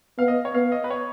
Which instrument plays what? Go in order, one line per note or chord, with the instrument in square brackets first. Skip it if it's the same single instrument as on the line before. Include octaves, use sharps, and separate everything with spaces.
[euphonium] B3 [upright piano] F5
[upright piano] D#5
C#5
[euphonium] B3 [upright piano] F5
[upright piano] D#5
B4
C#5